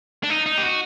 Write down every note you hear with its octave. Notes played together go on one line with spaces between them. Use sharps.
D4
D#4
D#4
G4
F#4